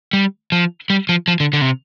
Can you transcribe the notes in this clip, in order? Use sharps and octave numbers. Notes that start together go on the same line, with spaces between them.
G3
F3
G3
F3
F3
D3
D3
C3